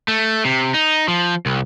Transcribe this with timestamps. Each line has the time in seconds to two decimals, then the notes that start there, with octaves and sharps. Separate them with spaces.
0.08 A3
0.45 C3
0.74 D#4
1.08 F3
1.46 C2